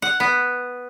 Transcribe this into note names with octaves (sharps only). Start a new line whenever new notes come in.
F#5
B3